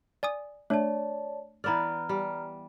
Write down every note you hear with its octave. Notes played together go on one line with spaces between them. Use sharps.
D5 G#5 D#6
A3 D4 C#5 D5 A5
E3 B3 D5 A#5 F6
G3